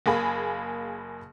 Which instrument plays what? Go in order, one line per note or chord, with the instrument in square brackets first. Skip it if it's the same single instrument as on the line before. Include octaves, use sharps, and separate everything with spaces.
[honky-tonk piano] F#1 A#3 G#4 B5